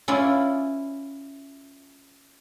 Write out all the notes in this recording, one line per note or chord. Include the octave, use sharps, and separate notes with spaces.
C#4 E4 F4 B4 D5